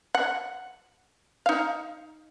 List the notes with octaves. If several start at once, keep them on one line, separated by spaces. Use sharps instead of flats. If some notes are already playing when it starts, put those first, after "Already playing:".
F#5
D#4 F5